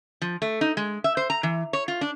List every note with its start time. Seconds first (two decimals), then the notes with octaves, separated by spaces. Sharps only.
0.22 F3
0.42 A3
0.61 D#4
0.77 G#3
1.04 E5
1.17 C5
1.30 A#5
1.43 E3
1.73 C#5
1.88 F4
2.01 D4